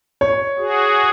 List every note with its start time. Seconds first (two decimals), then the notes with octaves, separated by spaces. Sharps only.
0.21 C#5
0.58 F#4 G#4